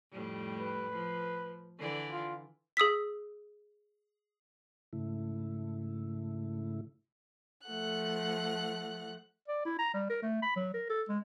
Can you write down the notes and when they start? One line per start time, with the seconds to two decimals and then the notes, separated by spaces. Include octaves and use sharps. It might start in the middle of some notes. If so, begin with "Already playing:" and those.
0.12 F2 A2 G3
0.60 B4
0.92 F3
1.78 D3 E3 D5
2.10 F4
2.77 G#4 D#6 E6 B6
4.93 G#2 C#3 A3 E4
7.67 F3 A3 F#5 F#6
9.48 D5
9.65 E4
9.79 A#5
9.94 G3
10.10 A#4
10.23 A3
10.43 B5
10.56 F#3
10.74 A#4
10.90 A4
11.09 G#3